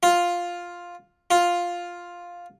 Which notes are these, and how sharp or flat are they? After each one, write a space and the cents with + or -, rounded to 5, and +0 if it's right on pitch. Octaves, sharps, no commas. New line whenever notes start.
F4 +5
F4 +5